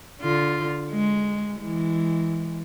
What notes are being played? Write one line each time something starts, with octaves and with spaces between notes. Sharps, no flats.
D3 F4
G#3
E3 G#3